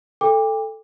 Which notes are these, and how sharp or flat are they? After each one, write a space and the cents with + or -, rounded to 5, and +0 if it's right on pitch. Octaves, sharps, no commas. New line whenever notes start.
A4 +0 G5 +35 D6 +0